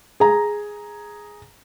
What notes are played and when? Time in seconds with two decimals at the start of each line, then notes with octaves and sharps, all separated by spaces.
0.20 G#4 A#5